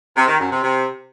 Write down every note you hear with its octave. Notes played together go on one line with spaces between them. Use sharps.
C3
D#3
F#2
C3
C3